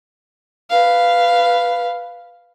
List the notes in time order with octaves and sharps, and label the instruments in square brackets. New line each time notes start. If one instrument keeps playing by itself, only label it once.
[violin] B4 F5